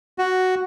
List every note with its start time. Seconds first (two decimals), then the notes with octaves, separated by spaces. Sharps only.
0.18 F#4